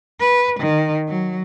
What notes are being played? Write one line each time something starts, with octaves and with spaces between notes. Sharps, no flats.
B4
D#3
F#3